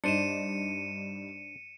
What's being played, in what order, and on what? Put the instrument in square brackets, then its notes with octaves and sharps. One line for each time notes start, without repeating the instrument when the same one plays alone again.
[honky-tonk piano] G2 D#4 [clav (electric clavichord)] D4 C5 [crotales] C#7 D#7 E7